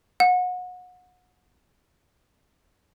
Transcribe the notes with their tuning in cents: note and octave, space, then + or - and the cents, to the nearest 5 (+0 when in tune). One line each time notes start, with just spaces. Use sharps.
F#5 -30